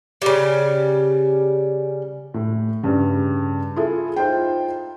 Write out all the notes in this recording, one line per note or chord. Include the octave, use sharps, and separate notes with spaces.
C#3 G3
A2
G2 C#3
E4 F4 G#4 A4
D#4 F4 C5 G5